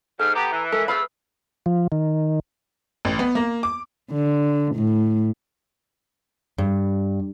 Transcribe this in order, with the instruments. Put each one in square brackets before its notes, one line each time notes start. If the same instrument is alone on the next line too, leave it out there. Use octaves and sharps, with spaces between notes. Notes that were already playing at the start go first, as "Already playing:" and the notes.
[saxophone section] G#2 [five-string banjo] A4 [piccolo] F6
[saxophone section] B3 G4 [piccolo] A#5
[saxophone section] E3
[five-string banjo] G#3 A4 A#4 [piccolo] B6
[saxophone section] F2 A3 F5 [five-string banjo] G#4 B4 B5 [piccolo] E6
[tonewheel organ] F3
D#3
[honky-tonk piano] A1
B3
A#3
D6
[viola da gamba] D3
A2
[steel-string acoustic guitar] G2